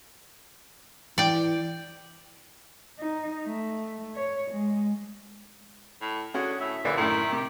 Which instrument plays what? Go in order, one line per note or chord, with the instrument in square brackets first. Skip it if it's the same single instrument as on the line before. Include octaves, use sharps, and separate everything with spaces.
[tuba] E3 [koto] D5 G5
[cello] D#4
A3
C#5
G#3
[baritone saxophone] A2
[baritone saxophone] D3 [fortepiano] C#4 F#4 [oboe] G#4
[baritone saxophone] A2 [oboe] E5
[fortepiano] A#1 D3 D4 [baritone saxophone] E3
[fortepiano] F#2 A2 E4 [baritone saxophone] D#3
[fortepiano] C3 [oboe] G4